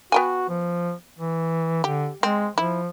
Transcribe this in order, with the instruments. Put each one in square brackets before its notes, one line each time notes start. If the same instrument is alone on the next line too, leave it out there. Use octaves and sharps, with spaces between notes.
[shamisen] B3 G5 G#5 [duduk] F#4
[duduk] F3
E3
[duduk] D3 [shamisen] G4
[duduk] G#3 [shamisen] C4
[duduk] F3 [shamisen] E4